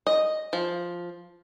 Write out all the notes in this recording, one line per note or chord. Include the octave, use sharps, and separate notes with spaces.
D#5
F3